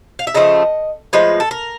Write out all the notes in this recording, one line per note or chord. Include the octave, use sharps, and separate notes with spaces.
F5
E5
C#3 F3 A3 D#5
A2 F3 G#3 B4
A4
A#4